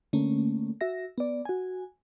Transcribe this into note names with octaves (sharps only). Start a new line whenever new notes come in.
D3 A3 A#3 C#4
F#4 E5 A#6
B3 D5
F#4 G#5